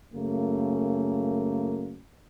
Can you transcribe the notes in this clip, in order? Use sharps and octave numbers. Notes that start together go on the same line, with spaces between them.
F#2 C#3 A3 A#3